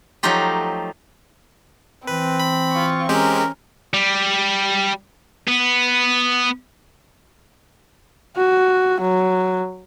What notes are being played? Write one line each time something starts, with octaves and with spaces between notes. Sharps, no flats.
F3 F#3 A3 D#4 F4 G4
E3 C4 B4
B5
F4 C#6
G#3 C4 C#4 G4 A#4
G3
B3
F#4
F#3